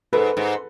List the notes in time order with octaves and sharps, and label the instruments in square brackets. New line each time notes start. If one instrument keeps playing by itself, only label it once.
[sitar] G#2 [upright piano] A4 B4
[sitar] G#2